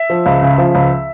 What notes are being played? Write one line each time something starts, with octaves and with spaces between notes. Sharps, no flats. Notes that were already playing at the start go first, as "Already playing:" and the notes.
Already playing: E5
F3
C#2
C#3
F3
C#2